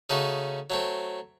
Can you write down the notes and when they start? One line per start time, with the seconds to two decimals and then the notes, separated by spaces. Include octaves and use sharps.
0.10 C#3 A3 D#4 F#4
0.70 F#3 A3 C4